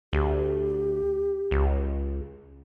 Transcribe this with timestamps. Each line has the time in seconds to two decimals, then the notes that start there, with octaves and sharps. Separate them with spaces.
0.13 D2 G4
1.51 C#2